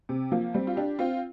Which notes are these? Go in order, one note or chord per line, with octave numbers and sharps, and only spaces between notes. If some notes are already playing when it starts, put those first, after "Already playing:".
C3
F3 A#3
G3 C4
F4
D4 G4
C4 F4